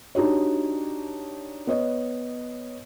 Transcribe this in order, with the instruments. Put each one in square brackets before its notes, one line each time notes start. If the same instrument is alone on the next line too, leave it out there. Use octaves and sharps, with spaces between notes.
[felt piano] D4 D#4 F#4 G4 C#5
B3 C#5 D#5